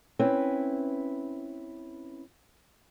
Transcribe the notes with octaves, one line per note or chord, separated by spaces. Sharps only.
C4 C#4 E4 B4